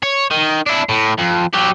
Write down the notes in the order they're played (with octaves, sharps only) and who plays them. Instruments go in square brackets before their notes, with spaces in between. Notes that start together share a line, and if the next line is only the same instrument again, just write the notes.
[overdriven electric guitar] C#5
D#3
D4 E4
A2
F2
F#3 G4